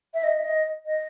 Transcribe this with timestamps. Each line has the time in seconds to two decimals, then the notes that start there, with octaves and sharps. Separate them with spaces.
0.14 E5
0.23 D#5
0.39 E5
0.44 D#5
0.86 D#5